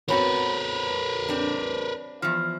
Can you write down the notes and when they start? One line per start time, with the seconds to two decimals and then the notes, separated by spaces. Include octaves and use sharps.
0.08 B3 C4 F#4 A#4 B4 C#5 B5
1.29 C4 D4
2.22 E2 F3 F6